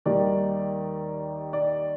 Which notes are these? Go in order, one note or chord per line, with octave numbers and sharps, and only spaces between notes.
D#2 D#3 G3 D5
D5